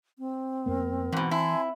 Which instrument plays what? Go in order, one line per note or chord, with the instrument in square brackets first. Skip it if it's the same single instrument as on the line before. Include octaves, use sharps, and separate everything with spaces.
[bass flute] C4
[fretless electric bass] F2 A#3 B3 [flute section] A#4
[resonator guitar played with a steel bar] G#2 B2 [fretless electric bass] E3
[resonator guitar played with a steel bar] E4 [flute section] G#5 A5 C6